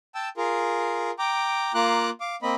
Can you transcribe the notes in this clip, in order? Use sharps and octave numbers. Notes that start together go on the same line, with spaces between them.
G5 A5 E6
F4 G#4 A#4
G5 A#5 D6
A#3 F4 A#5 D6 F#6
F5 D6
A#3 C4 D#5 B5